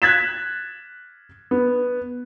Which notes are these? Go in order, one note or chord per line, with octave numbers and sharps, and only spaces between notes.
F#6 G#6 A6 B6 E7
B3